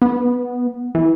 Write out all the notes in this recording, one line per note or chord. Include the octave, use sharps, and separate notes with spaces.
B3
E3